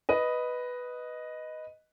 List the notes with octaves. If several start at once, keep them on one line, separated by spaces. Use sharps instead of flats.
B4 D#5